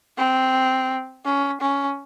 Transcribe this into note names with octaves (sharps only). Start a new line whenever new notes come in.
C4
C#4
C#4